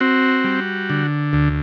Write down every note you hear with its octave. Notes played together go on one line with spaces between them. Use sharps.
C4 F#4
G3
D3
D2